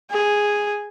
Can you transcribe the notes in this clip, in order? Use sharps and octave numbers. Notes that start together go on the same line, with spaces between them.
G#4